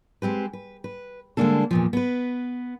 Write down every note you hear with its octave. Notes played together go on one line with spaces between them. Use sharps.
G#3 C4 G4 B4
B4
B4
D3 G3 G#3 A#3 D4 A4
E2 A#2 F3
B3 B4